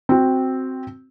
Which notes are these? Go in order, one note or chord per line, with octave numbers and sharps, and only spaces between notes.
C4 F#4